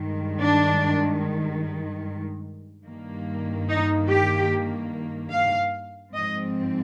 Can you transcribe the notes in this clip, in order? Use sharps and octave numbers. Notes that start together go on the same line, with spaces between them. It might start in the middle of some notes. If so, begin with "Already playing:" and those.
Already playing: G2 D#3 G#3
D4
G2 D#3 A#3
D#4
G4
F5
G#2 F3 C4 D#5